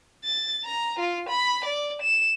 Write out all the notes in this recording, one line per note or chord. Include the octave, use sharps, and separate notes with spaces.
A6
A#5
F4
B5
D5
E7